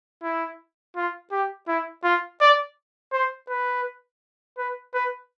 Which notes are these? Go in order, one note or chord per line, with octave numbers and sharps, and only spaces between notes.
E4
F4
G4
E4
F4
D5
C5
B4
B4
B4